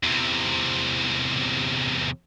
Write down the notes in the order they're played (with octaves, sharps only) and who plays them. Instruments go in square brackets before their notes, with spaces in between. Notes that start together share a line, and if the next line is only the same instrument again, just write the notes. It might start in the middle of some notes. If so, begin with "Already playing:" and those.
[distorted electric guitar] E2 C3